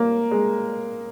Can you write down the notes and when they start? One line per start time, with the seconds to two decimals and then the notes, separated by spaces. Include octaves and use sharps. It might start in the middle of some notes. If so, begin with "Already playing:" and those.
Already playing: A#3
0.31 G#3